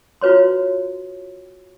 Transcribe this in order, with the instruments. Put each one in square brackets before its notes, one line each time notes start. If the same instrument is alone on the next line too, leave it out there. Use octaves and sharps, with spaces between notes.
[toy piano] F4 F#4 B4 C#5 C6